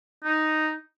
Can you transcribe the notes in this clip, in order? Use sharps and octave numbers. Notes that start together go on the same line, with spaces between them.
D#4